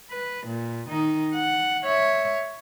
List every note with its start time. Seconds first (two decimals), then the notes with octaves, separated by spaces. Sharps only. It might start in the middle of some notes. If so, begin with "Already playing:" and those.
0.11 B4
0.46 A#2
0.89 D#3 D#4
1.35 F#5
1.84 C#5 E5